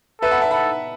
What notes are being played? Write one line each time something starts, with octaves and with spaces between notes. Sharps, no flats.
A4 B4 E5
F#5 B5
E5 A5
A4 F#5 B5